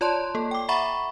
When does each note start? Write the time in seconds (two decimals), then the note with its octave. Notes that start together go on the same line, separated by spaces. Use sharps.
0.01 F4 C#5 D5 A5 C6
0.35 A#3 A4
0.51 G5 D6
0.69 E5 F#5 A#5 B5 C#6